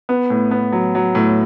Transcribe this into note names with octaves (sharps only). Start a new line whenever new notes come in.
B3
A2
B3
F#3
F#3
A2